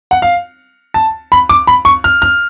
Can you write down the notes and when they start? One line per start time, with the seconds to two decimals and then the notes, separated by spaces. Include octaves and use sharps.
0.11 F#5
0.22 F5
0.94 A5
1.32 B5
1.49 D6
1.67 B5
1.85 C#6
2.04 F6
2.22 F6